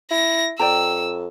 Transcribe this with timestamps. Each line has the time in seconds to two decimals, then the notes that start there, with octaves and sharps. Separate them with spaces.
0.11 E4 A#6
0.59 F2 D5 G5 A#5 E6